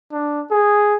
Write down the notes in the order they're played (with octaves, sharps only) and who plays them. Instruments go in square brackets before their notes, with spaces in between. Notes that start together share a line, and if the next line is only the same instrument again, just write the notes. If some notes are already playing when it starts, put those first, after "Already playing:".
[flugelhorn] D4
G#4